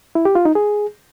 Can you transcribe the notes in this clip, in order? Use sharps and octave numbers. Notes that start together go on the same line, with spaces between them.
E4
G4
F4
D#4
G#4